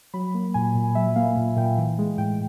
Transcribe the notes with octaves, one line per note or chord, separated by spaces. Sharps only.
F#3 B5
A#3
A#2 G#5
A#2
F#3 E5
A#3 F5
A#2
A#2 G5
E3
G#3
A2 G5